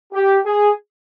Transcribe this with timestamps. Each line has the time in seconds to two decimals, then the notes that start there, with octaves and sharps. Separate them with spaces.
0.13 G4
0.46 G#4